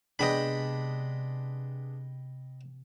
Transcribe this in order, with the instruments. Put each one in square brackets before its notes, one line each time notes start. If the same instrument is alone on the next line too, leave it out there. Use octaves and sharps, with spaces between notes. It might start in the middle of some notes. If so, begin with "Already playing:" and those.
[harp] C3 [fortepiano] G#3 B3 D4 [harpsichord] D#5 G5 B5